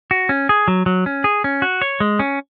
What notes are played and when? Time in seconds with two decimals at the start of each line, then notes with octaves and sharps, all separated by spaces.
0.11 F#4
0.29 C#4
0.49 G#4
0.68 F#3
0.86 F#3
1.06 C#4
1.24 G#4
1.44 C#4
1.62 F#4
1.82 C#5
2.00 G#3
2.19 C#4